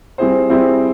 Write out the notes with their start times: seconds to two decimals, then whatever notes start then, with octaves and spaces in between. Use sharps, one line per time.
0.18 G3 C4 E4 G#4 C5
0.49 G3 C4 E4 G#4 C5